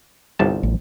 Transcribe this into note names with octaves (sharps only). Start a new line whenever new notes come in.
G1 C2 A5
A1